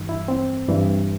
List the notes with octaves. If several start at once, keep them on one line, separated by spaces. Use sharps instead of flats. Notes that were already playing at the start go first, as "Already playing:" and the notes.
Already playing: G2 E3
E4
C4
G2 E3